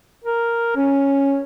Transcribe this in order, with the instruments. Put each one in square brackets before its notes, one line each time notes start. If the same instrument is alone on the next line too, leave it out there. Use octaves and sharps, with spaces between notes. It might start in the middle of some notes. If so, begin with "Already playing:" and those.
[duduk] A#4
C#4